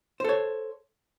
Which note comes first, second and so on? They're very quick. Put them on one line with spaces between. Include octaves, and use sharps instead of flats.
C5 A4 C#5